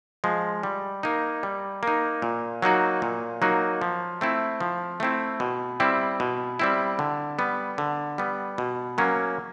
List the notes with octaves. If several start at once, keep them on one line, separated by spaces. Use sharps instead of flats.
F3 G#3
G3
A#3 D#4
G3
A#3 D#4
A#2
F#3 A#3 D#4 F#4
A#2
F#3 A#3 D#4 F#4
F3
A3 C4 E4
F3
A3 C4 E4
B2
G3 C4 E4
B2
G3 C4 E4
D3
G3 B3
D3
G3 B3
B2
F#3 A#3 C#4